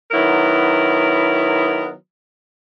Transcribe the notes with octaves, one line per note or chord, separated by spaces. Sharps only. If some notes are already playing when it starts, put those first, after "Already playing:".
D#3 F#3 B3 E4 A#4